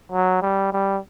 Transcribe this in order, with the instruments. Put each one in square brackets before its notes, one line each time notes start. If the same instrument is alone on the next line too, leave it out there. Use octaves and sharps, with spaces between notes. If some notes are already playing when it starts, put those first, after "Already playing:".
[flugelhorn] F#3
G3
G3